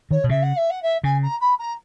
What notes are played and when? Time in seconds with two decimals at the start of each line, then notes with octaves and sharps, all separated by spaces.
0.11 D#3 C#5
0.24 B2
0.29 C#3 E5
0.42 F#5
0.56 E5
0.70 F#5
0.82 E5
1.04 C#3 G#5
1.22 A#5
1.40 B5
1.59 A#5